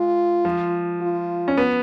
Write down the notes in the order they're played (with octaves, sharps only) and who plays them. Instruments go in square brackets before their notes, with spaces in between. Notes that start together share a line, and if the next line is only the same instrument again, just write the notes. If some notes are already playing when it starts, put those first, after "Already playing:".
Already playing: [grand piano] G#3 [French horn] F4
[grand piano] F3
[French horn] F4
[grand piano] C#4
B3